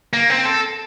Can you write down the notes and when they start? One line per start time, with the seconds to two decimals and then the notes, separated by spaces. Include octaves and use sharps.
0.13 A#3
0.30 C4
0.45 A4